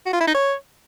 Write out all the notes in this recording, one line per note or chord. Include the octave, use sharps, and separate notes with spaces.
F#4
F4
E4
D#4
C#5